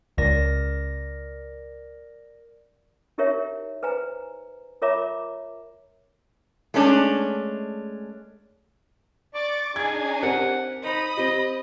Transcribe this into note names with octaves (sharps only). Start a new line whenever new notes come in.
C#2 A#4 D5 A#6
D#4 E4 G4 A#4 C#5 E5
B4 C5 G#5 A#5
F4 A#4 C#5 E5 A#5 D6
G#3 A3 C#4 D4
D5 C#6 D6 A6
D4 D#4 G#4 G#5 G#6
C4 G4 A#4 F#5
D#4 C5 B5 D#6
C4 G4 D#5